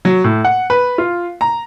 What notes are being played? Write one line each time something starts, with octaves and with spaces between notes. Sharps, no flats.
F#3
A2
F#5
B4
F4
A#5